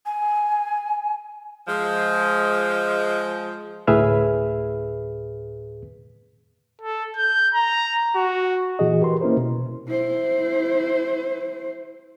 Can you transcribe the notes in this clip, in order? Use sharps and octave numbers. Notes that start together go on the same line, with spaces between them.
G#5
F3 G#3
D2 A2 G#4 B4 E5 F6
A4
G6
A#5
F#4
A#2 E3 F#4 G#4 D#5
G4 A#4 B4 C6
A#3 C#4 E4 A#4 C5
B2
E4 C5